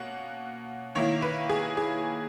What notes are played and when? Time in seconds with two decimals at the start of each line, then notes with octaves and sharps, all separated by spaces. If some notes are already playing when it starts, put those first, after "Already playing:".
Already playing: B2 A#3 C#4 F#5
0.95 D#3 A#3 E4 C#5
1.22 B4
1.49 G#4
1.77 G#4